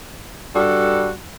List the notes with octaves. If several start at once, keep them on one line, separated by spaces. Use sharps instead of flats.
G2 G3 F#4 A4